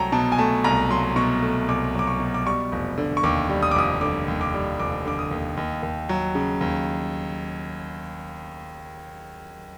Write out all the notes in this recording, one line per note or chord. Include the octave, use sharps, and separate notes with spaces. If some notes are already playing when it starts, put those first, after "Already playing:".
Already playing: C2 F#3 A3 G5 A5 A#5
B2 A5
G#5
A3 A5
C2 A#5
F#3 C6
B2 C#6
A3
C2 D6
F#3 D6
C#6
B2
D6
G3 C#6
F1
D3
C#6
D#2 D6
G3
D#6
D6
F1 D#6
D3 D6
D#2
D6
G3
F1 D6
D3 D6
D#6
D#2
D#2
D#2
F#3
C#3
D#2